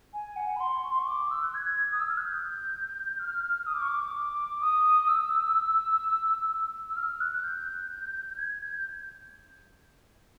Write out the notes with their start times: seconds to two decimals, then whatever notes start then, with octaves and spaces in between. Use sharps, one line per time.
0.13 G#5
0.36 F#5
0.56 B5
0.60 C6
0.84 C#6
0.91 C6
0.99 C#6
1.07 D6
1.31 E6
1.42 F#6
1.54 G#6
1.65 G#6
1.92 D#6
2.00 E6
2.09 F6
2.17 F#6
2.25 G6
3.19 F6
3.43 F6
3.66 D#6
3.73 D6
3.81 C#6
3.88 D6
4.61 D#6
5.08 E6
6.89 E6
6.96 F6
7.20 F#6
7.33 F#6
7.44 G6
8.38 G#6
8.61 G6